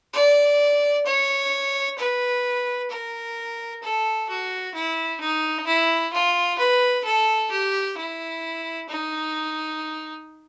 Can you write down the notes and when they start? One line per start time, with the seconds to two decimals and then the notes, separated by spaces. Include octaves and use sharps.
0.13 D5
1.06 C#5
1.98 B4
2.90 A#4
3.83 A4
4.29 F#4
4.74 E4
5.20 D#4
5.66 E4
6.13 F4
6.58 B4
7.04 A4
7.51 G4
7.97 E4
8.88 D#4